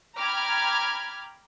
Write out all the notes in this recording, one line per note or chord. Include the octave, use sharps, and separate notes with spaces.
G5 A#5 B5 D6 F6 G#6